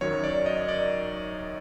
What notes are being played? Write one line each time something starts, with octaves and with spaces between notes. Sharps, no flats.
F#2 D#3 F#3 C#5
D5
D#5
D5